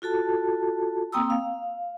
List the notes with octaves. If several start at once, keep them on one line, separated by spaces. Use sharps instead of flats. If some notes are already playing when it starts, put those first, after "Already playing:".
F4 F#4 A4 A5
A#3 C4 G5 A#5 D#6 E6
F5